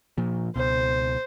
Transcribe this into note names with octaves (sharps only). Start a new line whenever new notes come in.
A#2 F3
C#2 B2 C5